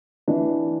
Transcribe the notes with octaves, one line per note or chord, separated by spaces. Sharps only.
E3 D4